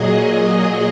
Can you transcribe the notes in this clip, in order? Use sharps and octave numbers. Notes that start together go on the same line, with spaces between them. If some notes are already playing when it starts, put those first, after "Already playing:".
Already playing: A#2 F#3 G#4 D#5